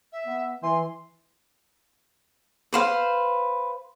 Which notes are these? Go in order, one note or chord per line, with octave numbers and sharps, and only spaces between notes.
E5
B3
E3 C6
B4 C5 F5